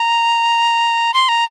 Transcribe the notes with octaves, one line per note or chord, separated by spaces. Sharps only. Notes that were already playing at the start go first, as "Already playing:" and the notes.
Already playing: A#5
C6
A#5